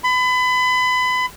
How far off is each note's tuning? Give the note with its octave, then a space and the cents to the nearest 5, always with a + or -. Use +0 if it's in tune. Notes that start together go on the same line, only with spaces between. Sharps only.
B5 +30